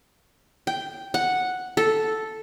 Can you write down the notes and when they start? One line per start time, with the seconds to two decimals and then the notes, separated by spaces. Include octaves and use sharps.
0.67 G5
1.14 F#5
1.77 A4